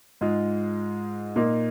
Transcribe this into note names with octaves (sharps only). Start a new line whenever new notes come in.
G#2 G#3 F4
A#2 A#3 D#4